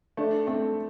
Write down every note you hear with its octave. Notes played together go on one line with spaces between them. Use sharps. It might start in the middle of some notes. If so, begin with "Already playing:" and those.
A3 D4
A3 C4